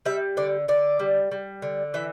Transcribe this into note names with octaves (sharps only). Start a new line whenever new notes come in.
G3 E5
D3 D5
D3 D5
G3
G3
D3
E3 E5